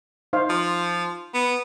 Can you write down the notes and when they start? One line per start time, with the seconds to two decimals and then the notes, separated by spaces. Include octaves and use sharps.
0.33 D#4 C5 F5
0.50 F3
1.34 B3